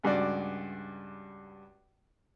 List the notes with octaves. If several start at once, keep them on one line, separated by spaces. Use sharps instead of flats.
C#2 G2 F#4 D5